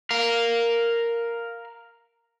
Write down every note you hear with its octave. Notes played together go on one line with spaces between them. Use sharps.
A#4 F5